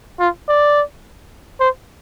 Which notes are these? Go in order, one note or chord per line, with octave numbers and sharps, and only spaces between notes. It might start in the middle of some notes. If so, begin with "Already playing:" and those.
F4
D5
C5